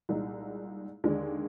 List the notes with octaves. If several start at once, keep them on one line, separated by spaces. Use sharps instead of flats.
C2 A#2 G#3 D#4
D#2 D3 G#3 D4